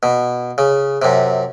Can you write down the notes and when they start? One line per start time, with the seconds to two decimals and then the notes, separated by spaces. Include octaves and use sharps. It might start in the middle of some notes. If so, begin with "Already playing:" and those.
0.03 B2
0.58 C#3
1.02 F#2 C3